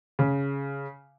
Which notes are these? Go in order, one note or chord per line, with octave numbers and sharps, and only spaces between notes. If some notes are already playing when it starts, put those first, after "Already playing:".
C#3